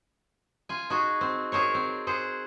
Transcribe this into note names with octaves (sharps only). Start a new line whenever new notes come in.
F4 G#5
D#4 F#4 G#4
C4
G#4 A#4 C5 C#5
C4
G#4 C5 F#5